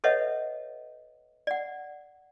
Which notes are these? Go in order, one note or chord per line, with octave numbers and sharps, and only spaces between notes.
A4 B4 C#5 D#5 E5 F#5
D5 F#5